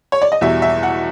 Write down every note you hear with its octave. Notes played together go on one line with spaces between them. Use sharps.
C#5
D5
D#5
E2 B2 G3 E5
E5
F#5